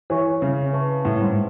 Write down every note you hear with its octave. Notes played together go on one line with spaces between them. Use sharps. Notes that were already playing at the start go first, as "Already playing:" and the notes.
E3 C#5 G#5 C#6
C#3
B4 E5 A5 C#6
A2
G#2